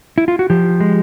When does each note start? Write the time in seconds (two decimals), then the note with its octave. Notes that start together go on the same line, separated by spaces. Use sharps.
0.18 E4
0.28 F4
0.39 F#4
0.50 F3 G4
0.80 G#3